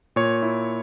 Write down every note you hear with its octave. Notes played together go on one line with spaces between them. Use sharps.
A#2 C#5
E4